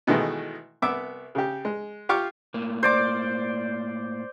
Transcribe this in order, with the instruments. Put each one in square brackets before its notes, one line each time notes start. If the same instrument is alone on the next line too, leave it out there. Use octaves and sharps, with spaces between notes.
[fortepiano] B2 D#3 E3 G#3 A3
C2 B3 E5 D6
C#3 G4
G#3
F4 G4 F5 C#6 D6 F6
[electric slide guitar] A2 A#3
[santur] C5 D5 D6